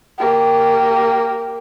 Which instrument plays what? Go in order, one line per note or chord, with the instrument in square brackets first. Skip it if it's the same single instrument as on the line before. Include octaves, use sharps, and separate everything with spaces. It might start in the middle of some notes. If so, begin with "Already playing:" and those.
[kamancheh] A#3 G4